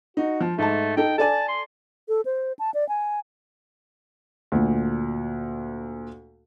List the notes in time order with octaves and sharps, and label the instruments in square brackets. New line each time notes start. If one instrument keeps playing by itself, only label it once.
[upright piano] D#4 [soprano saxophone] F#4
[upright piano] F3
[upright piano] G#2 A5 [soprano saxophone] A3
[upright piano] D#4 A4 [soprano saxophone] G5
[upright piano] A4 D5 G#5 [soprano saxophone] A5
[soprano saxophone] C6
[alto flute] A4
C5
A5
D5
G#5
[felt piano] D2 A#2